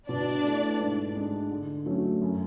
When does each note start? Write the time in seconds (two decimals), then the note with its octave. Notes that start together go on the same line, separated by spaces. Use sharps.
0.08 B2 D4 D5
0.44 A3 E4 A4
0.80 G#2
1.15 G#3 D4
1.51 D3
1.86 F#3 A3 C#4
2.22 F#2